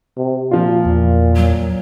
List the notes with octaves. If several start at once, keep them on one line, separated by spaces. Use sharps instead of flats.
C3
A#2 F3 F4
E2
F#3